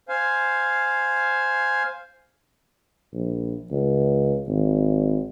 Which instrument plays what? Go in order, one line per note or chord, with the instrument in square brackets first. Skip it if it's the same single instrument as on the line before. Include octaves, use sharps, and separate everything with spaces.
[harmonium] C5 F5 G#5
[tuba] A#1
C#2
G#1